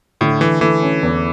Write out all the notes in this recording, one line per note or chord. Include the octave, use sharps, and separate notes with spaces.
A2 D3
E3 A3
E3 A3
C#4
E2